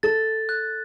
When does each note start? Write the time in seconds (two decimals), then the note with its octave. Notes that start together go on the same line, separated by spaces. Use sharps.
0.03 A4 A6
0.49 F#6